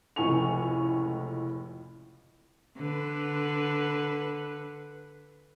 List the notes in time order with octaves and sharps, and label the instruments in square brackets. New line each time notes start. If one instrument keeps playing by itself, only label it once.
[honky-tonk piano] F1 C#2 A2 G#5 C#6 F7
[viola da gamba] D3 B4